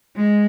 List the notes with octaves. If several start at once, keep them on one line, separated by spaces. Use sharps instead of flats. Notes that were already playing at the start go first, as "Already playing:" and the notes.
G#3